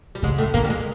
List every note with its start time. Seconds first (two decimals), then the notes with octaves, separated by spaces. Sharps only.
0.15 G3
0.22 G#2 C#3 G#3
0.38 A2 A3
0.54 A#2 D3 A#3
0.64 G3
0.70 G#3